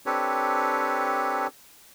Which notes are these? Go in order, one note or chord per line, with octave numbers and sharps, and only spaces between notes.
C4 D4 G4 A4 B4 C#5